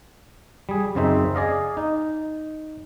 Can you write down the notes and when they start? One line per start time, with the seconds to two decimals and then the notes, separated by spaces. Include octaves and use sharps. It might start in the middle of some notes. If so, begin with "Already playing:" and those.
0.69 G3 G#4
0.95 F#2 C#3 C4 D#4 E5
1.35 G#4 D5 D#5 F5
1.77 D#4